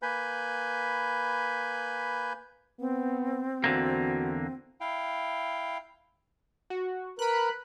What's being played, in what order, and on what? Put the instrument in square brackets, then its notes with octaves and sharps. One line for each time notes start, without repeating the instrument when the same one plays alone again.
[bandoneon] A#3 B4 G#5 B5 G6
[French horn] B3 [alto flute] C4
[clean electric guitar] E2 D3 A#3 [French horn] F#4
[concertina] E4 F5 G5
[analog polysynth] F#4
[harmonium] A#4 B4 [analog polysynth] B5 F#6